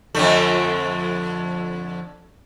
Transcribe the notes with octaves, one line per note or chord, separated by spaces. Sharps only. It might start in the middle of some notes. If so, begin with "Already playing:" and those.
F2 D3 A3